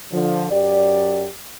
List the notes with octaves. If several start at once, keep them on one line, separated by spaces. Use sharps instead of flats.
D3 F3
F#2 G4 D5